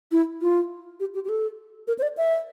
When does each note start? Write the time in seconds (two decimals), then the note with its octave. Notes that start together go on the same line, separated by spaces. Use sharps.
0.12 E4
0.42 F4
1.00 G4
1.14 G4
1.25 G4
1.29 A4
1.87 A#4
1.99 C5
2.02 D5
2.17 E5